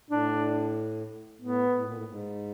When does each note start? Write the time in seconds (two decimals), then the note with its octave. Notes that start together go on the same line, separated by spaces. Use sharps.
0.10 A2 D4
1.41 A2 B3
1.75 A2
1.86 A#2
1.96 A2
2.08 G#2